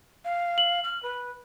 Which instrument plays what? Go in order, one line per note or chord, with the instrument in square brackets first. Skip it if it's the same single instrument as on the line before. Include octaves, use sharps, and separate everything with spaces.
[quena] F5
[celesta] F#7
[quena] F6
B4